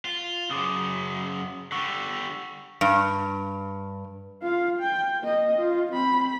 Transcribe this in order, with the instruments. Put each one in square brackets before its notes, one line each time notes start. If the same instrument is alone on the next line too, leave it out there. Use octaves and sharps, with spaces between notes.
[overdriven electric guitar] F4
[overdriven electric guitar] F#2 C#3 [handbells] C6 D6 D#6
[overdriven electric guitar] D3 G3 [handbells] C#6 E6
[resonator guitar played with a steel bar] G2
[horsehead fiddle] F4 F5
G5
A#3 D#5
F4
C4 B5